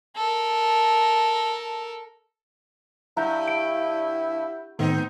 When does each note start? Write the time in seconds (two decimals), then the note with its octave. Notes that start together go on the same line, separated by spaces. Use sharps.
0.16 A4 A#4
3.17 G2 E4 F#5 A#5 G6
3.48 D7
4.79 A2 D#3 A3 B3 C4 D#4